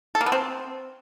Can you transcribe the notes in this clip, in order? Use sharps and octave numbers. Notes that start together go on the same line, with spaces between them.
A4
A#3
B3
C4